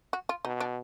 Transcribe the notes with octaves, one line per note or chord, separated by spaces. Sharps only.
F#4
F4
B2 D#4
D4